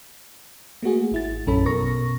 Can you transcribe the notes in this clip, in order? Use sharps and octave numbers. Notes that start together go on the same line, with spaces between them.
A3 A#3 F#4 G#4
G#1 E4 A6
A#1 F#2 C#4 A4 B5
B2 A#4 C#6 A#6